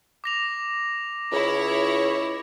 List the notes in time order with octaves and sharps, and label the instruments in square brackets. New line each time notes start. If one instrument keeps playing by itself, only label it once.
[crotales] D6 A#6 F7
[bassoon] C#2 [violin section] E4 C#5